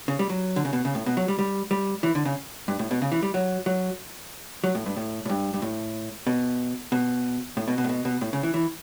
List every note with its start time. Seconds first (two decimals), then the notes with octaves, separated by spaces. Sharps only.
0.08 C#3
0.19 G3
0.29 F#3
0.56 D3
0.65 C#3
0.73 B2
0.85 C#3
0.95 A2
1.06 B2
1.17 F#3
1.28 G3
1.39 G3
1.71 G3
2.03 E3
2.15 D3
2.25 C#3
2.68 G2
2.79 A2
2.91 B2
3.02 C#3
3.12 E3
3.22 G3
3.34 F#3
3.66 F#3
4.64 F#3
4.75 A2
4.86 G2
4.97 A2
5.25 A2
5.30 G2
5.54 G2
5.62 A2
6.27 B2
6.92 B2
7.57 A2
7.68 B2
7.78 B2
7.84 A2
7.89 B2
8.05 B2
8.21 A2
8.33 C#3
8.43 E3
8.54 E3